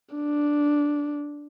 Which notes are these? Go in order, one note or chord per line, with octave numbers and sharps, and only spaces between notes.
D4